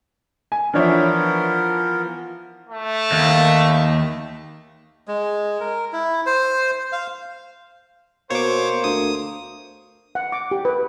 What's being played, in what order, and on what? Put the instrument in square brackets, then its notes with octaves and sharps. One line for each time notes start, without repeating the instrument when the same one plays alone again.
[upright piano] G#5
[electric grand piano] E3 F3 [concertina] B3 A#4 [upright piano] D4 C#5 E5
[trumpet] A3
[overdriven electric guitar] D#2
[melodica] G#3
A#4
E4
C5
F5
[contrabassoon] B2 [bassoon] A#3 [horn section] C5 [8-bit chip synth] C#5 D6
[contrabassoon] D2 [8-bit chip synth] D#6
[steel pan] F#5
D6
G4
B4